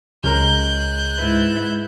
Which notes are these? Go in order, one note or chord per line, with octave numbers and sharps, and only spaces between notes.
C#2 G#3 C#4 A#4 F#6 G6
G#2 E4 B4